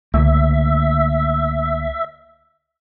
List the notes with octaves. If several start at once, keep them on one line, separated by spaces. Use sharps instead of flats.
C#2 D3 A3 A#3 E5